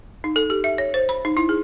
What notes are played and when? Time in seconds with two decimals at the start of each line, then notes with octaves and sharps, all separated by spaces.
0.24 D#4
0.36 A4
0.50 G4
0.64 E5
0.78 C#5
0.94 C5
1.09 B5
1.25 D#4
1.37 E4
1.49 G#4